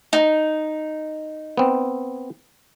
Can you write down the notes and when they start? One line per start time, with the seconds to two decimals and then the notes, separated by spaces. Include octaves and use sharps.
0.13 D#4
1.57 B3 C4